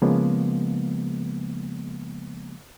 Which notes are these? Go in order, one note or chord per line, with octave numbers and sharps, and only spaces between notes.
C#3 F3 G#3 A#3 B3